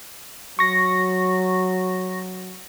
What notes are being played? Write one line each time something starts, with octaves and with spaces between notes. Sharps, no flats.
F#3 C#6 A#6